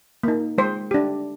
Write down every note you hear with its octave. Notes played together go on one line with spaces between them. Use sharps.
A#3 D#4
G#3 C5
D4 G4